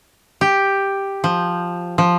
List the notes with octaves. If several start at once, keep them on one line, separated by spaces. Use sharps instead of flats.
G4
F3
F3